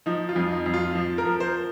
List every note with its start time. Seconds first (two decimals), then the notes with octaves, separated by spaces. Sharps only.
0.06 F3 D#4
0.29 F4
0.36 F2
0.51 D#4
0.66 F2
0.74 F4
0.95 F3
1.18 A#4
1.25 F3
1.40 C5